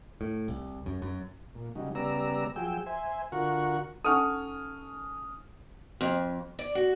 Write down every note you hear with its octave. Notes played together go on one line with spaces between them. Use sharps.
A2
C2
F#2
F#2
A#2
C#3 F#3 G3 D#4
C#3 G3 B3 D5 A#5 E6
F3 F#3 G#4 G5 E6
C5 E5 G#5
D3 F4 F#4 A#4 F#5 C#6
C#4 D#4 A4 F#5 G#5 C#6 D#6 F6
F2
D5
F#4